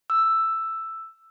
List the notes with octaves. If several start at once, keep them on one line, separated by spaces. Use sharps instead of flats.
E6